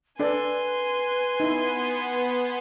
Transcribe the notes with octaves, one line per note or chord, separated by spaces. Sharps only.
D4 A4 B4 D5 G#5 C6
B3 D#4 E4